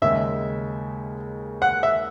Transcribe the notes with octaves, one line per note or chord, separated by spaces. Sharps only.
D#2 C#3 G#3 C#4 E5
F#5
E5